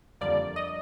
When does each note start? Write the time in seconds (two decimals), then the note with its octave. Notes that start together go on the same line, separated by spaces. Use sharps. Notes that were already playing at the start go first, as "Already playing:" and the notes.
0.21 F2 D3 G3 A#3 D5
0.56 D#5